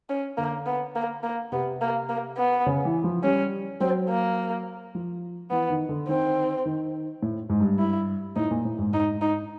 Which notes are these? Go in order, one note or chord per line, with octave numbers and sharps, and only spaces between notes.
C#4
D3 A#3
B3
A#3
A#3
C3 B3
A#3
A#3
B3
C#3
E3
F3
G3 C#4
F#3 C4
A#3
F3
E3 B3
D#3
D3
D#3 C4
D#3
A2
G#2
G2
E4
A2 D#4
A#2
A2
G#2
G#2 D#4
D#4